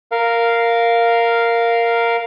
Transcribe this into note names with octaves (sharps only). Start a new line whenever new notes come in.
A#4 F5